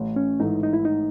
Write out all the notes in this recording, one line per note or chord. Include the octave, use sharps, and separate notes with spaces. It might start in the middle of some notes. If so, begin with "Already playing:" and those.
Already playing: A1
C#4
G#2 E3 A3 D#4
D#4
E4
D#4